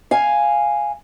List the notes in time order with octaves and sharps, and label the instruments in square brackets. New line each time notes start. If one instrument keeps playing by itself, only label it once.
[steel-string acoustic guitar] F5 G#5